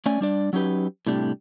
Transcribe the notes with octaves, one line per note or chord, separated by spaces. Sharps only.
A3 C#4 D5 G#5
G3 D4 D5
F#3 C#4 D#4 G4 B4
A2 C3 G3 D4